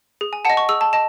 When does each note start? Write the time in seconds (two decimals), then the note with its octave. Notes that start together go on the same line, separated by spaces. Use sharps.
0.21 G#4
0.33 G#5
0.45 D#5 F#5 A5
0.57 C#6
0.69 G#4 E6
0.81 A5
0.93 D#5 A5